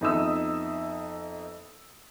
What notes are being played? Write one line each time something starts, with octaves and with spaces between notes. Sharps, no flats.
F2 B3 D#4 E5 D#6 E6